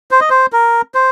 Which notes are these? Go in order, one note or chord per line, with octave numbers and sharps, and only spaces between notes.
C5
D#5
C5
A#4
C5